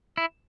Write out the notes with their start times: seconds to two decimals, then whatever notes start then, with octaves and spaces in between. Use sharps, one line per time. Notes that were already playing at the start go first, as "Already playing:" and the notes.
0.17 E4